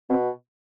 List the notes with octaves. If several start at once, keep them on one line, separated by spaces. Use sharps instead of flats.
B2 C4